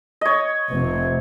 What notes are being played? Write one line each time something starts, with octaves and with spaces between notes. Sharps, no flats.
C#5 D#5
F1 C3